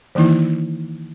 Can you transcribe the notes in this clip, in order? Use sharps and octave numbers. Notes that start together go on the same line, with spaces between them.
D#3 E3 A#3 D#4 E4